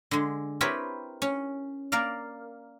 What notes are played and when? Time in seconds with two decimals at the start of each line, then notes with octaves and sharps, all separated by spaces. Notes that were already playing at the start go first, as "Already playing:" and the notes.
0.11 D3 G#3
0.61 C4 E4 G4 A#4 B4 C#5
1.22 C#4
1.92 A#3 A#4 D5 F5